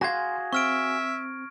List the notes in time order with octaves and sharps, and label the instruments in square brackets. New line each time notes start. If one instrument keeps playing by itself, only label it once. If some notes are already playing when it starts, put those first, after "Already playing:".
[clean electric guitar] F#4 G#4 F5 [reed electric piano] G#5 C6 [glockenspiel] G#6 A#6
[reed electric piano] C4 [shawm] E5 [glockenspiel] C#6 F6 D7